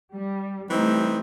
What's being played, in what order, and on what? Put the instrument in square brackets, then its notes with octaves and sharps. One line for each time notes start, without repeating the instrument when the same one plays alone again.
[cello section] G3
[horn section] E3 C4 D#4 [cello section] G3 A3